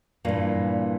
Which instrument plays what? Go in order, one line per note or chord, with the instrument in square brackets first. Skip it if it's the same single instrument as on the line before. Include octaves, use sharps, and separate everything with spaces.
[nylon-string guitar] G2 A#2 E3 A#3